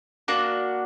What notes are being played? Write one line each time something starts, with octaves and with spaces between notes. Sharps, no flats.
A#3 D4 F#4 D5